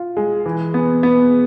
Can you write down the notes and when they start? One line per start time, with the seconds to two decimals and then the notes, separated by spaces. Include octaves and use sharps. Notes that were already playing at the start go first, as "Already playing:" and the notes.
Already playing: F4
0.17 G#3
0.46 E3
0.74 B3
1.03 B3